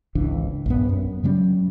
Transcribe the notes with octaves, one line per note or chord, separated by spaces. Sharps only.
G#1 C#2 E3 D4
A#1 G2 B3
F#2
C#3 F#3 G3 C#4